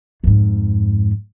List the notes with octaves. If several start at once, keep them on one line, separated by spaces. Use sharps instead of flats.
F2 G#2